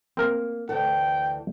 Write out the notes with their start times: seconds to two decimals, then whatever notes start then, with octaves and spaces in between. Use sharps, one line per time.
0.17 A#3 C4 A#4
0.69 D2 E3 A4 G5